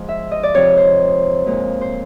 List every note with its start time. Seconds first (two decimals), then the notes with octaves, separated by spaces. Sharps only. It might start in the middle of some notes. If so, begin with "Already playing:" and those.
Already playing: G#2 F3 G#3
0.08 E5
0.31 D#5
0.43 D5
0.54 F2 C3 F3 C#5
0.77 C5
1.46 A#2 F3 G#3
1.81 C5